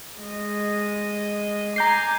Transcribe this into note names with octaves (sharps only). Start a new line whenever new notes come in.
G#3 D#5
G#5 A#5 D6 G6 C7